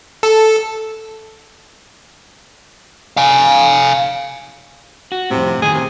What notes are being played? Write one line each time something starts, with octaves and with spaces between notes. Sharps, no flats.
A4
F5 G#5
F#4
F2 A2 C3
A2 D#3 G#4 G#5
C3